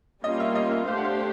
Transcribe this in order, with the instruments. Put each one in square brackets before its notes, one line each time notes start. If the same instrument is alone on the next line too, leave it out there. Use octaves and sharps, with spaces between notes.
[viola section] G3 A#3 C#4 F4 [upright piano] D#5
[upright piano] E5
D#5
E5
[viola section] A3 D4 G4 C5 [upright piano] F5
[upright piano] F#5
F5